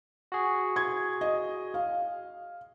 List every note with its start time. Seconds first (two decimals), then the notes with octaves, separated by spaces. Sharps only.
0.32 F#4 G#4
0.76 G#6
1.21 D#5
1.74 F5